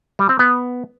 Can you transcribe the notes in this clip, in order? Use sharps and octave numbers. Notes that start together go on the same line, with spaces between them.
G3
C4
B3